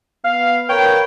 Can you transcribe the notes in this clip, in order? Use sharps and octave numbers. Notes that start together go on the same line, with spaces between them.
B3 F5
A#4 B4 C#5 G5